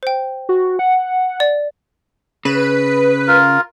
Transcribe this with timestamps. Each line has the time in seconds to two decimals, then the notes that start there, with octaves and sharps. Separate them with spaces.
0.03 C5 G5
0.49 F#4
0.79 F#5
1.40 D5
2.45 C#3 B4
3.28 F4 A#4